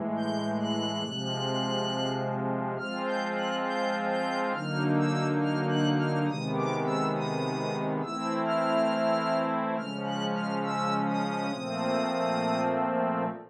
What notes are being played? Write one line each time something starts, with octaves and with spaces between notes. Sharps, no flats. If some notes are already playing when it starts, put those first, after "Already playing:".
Already playing: A2 E3 G#3
G6
F#6
C3 F3 G#3
F3 G#3 C4 F4 F6
G6
F#6
G6
G6
D3 F#3 A#3 D#4 F6
E6
F6
F#6
F6
C3 D#3 G#3 B3 D#6
D6
E6
D#6
E3 A3 C4 E4 E6
F6
C#3 F3 G#3 C#4 F6
F#6
F6
E6
D#6
A#2 F3 A3 C4